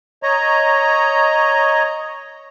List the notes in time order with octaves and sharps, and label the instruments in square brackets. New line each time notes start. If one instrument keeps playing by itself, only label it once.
[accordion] C#5 D#5 A#5